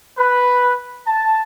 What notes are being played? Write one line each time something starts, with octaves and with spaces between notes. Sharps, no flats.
B4
A5